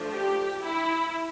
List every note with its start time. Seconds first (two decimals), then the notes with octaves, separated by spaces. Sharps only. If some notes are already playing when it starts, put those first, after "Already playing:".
Already playing: F3 A3 D4
0.13 G4
0.64 E4